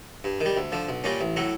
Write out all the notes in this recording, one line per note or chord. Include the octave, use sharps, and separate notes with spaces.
G2
D#3
G3
D2
D3 F3
B1
A#2 G3 A#3 C#4
A1
A2 F#3 A3